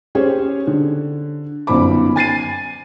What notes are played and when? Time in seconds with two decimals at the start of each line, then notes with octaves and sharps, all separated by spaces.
0.15 C#4 G4 G#4 C5 C#5
0.67 D3
1.67 G1 F#2 D#3 C5 B5 D6
2.16 G#5 A6 C7 D#7